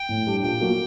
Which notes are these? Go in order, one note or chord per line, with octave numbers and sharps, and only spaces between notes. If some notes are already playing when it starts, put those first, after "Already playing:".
Already playing: G5
A2
G3 D4
A#2 G5
F#3 A#3 F#4